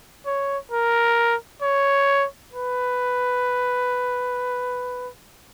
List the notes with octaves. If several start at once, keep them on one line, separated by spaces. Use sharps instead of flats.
C#5
A#4
C#5
B4